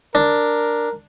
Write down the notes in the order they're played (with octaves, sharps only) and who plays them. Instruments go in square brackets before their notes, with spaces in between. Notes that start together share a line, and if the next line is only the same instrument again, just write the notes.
[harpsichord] D4 [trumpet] A#4